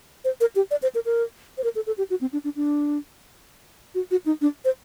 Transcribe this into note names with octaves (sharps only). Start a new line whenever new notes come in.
C5
A#4
G4
D5
C5
A#4
A#4
C5
A#4
A4
A4
G4
F#4
C4
D4
D4
D4
F#4
F#4
D#4
D4
C5